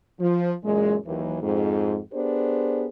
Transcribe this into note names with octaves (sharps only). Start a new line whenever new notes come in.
F3
F#2 A#2 E3 G#3
D#2 E3 F#3
F2 G#2 F3
B3 D4 G4 G#4 A#4 C5